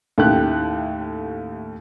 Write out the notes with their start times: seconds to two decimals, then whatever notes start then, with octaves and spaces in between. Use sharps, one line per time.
0.18 D#2 A2 A3 C#4 G4 F#6